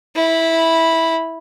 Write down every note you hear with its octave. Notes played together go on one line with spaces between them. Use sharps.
E4 B5